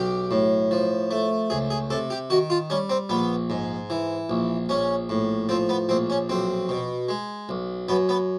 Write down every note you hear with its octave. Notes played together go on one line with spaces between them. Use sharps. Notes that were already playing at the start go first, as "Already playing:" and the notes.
Already playing: B1 G4
A2
F3
A3
C#2 G#4
G#4
C3 A4
G4
D#3 F#4
F4
G3 C#4
C4
A#1 B3
G#2
E3
A#1
A#1 C#4
A2
F3 C4
B3
A#1 C4
C#4
B1 C4
B2
G#3
B1
F#2 B3
B3